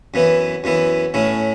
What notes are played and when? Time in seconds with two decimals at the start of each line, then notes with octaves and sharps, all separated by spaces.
0.14 F#2 E3 B3 E4
0.64 F#2 E3 B3 E4
1.14 A2 A3 C#4 E4